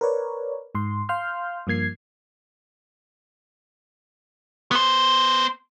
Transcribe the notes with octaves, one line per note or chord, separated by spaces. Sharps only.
A#4 B4 C#5 D5
G#2 C6
F5 C6 F6 G6
G2 F3 A#3 G#6 C7
B3 C5